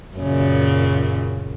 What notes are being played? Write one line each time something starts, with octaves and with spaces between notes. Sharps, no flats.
F#2 A#2 C#3